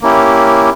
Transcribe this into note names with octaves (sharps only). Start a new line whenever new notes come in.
A#3 C#4 E4 G4